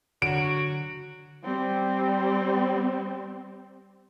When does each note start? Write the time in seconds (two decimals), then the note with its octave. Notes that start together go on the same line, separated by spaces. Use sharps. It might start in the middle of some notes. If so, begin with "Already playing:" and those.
0.22 D3 F#3 F#4 D7
1.44 G3 C4